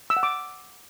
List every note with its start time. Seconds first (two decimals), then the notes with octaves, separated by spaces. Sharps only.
0.10 E6
0.17 F#5
0.23 D6